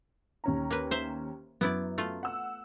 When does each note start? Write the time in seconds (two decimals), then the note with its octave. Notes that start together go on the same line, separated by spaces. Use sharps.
0.44 D#2 C#4 A#5
0.71 A#3 B4
0.91 C5 E5
1.61 F#2 B3 E4 D5
1.98 A3 F4
2.23 F#5 E6